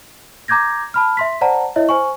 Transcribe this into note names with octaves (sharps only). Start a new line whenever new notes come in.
A#5 D6 G6 G#6 A#6
A5 B5 F6
E5 C6 B6
C5 D5 F#5 A5 A#5
E4 C#5 D#5 E5
C5 G#5 C#6